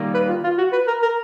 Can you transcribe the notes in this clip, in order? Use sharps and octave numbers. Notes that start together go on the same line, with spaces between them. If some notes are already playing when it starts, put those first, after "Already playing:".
Already playing: D#3 G3 A#3
B4
F4
F4
F#4
B4
A#4
A#4